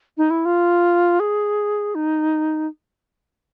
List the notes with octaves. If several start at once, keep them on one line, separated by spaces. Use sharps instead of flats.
D#4
E4
F4
G#4
D#4